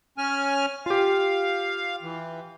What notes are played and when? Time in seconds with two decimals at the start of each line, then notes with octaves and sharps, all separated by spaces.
0.18 C#4 G#5 F6
0.86 F4 G4 F5
2.03 E3